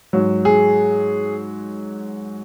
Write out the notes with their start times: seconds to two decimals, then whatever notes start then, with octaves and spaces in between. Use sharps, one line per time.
0.13 G#2 F#3
0.45 G#4